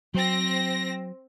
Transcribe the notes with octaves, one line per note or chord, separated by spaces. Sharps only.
F#3 C4 A#6